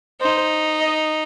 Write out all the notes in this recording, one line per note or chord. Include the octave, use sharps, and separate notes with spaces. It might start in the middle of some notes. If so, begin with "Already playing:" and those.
D#4 C5
D#5